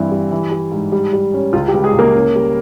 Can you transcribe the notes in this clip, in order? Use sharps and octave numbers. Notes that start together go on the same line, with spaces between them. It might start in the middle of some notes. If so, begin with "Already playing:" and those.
Already playing: G2 E3 C4 E4
G3
E3
G3
G#2
G3
G3
C#4
C#2 F4
G3 G4
C#2
G#3 G#4
C#2 A#3 A#4
C#4
G3